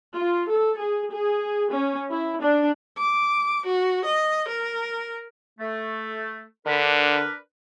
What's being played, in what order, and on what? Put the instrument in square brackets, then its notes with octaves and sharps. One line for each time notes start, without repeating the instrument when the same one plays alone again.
[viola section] F4
A4
G#4
G#4
C#4
E4
D4
[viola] D6
F#4
D#5
A#4
[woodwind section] A3
[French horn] D3 [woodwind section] D4 A#4 B4